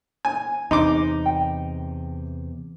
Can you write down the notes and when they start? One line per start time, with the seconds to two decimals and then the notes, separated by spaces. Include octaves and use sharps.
0.25 G#5
0.71 E2 C3 D#4 C6 D6
1.26 G5